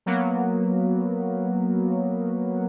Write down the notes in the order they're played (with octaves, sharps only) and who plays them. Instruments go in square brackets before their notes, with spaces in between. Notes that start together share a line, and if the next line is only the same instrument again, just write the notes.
[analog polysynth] F#3 A#3 B3